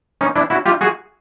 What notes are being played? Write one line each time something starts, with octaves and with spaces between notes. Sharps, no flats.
C#4 D#4
D4 E4
E4 F#4
F4 G4
F#4 G#4